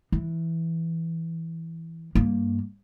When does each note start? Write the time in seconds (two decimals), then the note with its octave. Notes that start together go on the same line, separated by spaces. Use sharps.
0.12 E3
2.15 G2 A#3